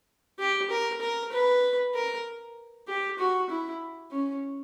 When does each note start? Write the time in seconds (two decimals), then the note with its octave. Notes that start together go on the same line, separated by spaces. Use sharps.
0.39 G4
0.70 A#4
1.01 A#4
1.32 B4
1.94 A#4
2.88 G4
3.19 F#4
3.49 E4
4.11 C#4